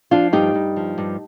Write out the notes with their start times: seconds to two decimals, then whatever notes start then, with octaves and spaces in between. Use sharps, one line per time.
0.11 F3 D4 F4
0.33 G2 D#4 G4
0.55 G2
0.76 F3
0.98 G2